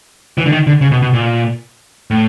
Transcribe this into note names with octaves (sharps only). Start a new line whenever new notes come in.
E3
D3
D#3
D3
C#3
B2
B2
A#2
A2